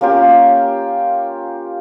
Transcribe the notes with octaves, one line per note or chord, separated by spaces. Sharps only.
A#3 C#4 F4 G4